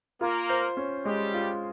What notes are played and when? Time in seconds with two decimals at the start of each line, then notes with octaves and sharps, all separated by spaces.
0.21 A#3 F4 A#4
0.49 C5
0.77 C#4
1.05 G3 G#3 G4
1.34 F4